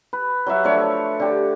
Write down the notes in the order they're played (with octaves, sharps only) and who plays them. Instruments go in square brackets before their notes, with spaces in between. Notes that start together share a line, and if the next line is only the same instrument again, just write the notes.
[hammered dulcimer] B4
F#3 F#4 E5 F#5
F3 A3 D4 C#5
D3 G4